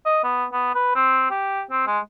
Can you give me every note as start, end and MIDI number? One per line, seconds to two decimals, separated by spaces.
0.05 0.19 75
0.24 0.46 59
0.53 0.74 59
0.75 0.92 71
0.95 1.27 60
1.31 1.63 67
1.71 1.83 60
1.87 1.99 56